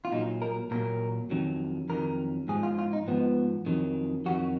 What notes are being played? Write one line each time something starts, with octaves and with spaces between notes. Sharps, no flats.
F4
A#2 F#3 D#4
A#4
A#2 F#3 A#4
F2 D#3 F#3
F2 D#3 F#3 A#4
G#2 F3 G#4
F4
F4
D#4
G#2 F3 B3
F2 D#3 F#3
F2 D#3 F#3 F#4